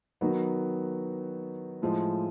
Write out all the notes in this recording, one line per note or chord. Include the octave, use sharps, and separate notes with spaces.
D#3 F#3 B3 D#4 F#4
A2 F3 G#3